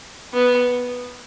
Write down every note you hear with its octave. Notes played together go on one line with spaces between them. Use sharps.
B3